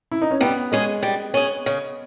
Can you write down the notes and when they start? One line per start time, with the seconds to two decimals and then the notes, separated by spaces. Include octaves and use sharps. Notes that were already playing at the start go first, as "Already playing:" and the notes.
0.12 E4
0.22 D#4
0.31 C#4
0.41 G3 B3
0.72 G#3 C#4 G#4
1.03 G3
1.34 C#4 G#4
1.66 C#3